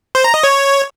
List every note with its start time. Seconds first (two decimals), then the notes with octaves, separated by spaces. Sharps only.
0.15 C5
0.24 A#5
0.34 D#5
0.43 C#5